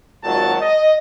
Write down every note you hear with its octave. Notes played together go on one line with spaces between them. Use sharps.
G#1 A#2 D#3 F#3 F#4 A5
D#5